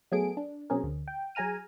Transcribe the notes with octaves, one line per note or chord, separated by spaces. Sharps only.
F#3 A3 B3 G#4 A4 D7
D4
B2 F#3 C4 C#4 G#4 A#4
D2 D3
G5
F#3 G#4 G#5 A#5 F6 D#7